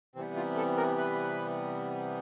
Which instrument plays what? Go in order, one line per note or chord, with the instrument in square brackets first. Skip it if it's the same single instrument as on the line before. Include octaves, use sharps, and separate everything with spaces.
[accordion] C3 E3 G3 B3 C4
F4
A4
A#4
B4